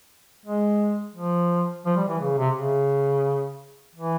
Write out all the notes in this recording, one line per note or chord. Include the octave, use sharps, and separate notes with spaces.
G#3
F3
F3
G3
E3
C#3
C3
C#3
E3